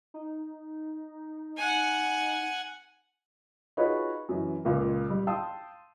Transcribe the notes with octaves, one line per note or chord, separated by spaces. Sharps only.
D#4
F#5 G#5
D#4 F4 F#4 G#4 B4 C#5
F#2 E3
C#2 A#2 A#3
G3
F5 G5 A5 C6 D#6 E6